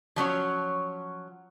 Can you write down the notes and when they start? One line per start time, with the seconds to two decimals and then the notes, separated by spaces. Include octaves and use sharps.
0.16 F3 F#3 C#4 C#5